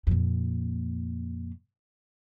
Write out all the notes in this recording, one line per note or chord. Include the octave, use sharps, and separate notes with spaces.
F2 A#2